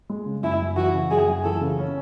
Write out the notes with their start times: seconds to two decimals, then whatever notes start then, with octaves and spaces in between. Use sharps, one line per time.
0.10 G#3
0.26 C#3
0.43 F#2 E4
0.60 F#2
0.76 E3 F#4
0.94 C#3
1.11 F#2 G#4
1.28 F#2
1.44 E3 A4
1.61 C#3
1.79 C#4